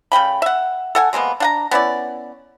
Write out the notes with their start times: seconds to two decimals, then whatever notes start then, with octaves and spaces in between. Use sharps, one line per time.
0.12 C#3 A3 G5 B5
0.42 E5 F#5
0.95 A4 F#5 G#5
1.13 C3 G#3 A#3 B3
1.40 D4 F#5 A#5
1.71 B3 C#4 E4 D5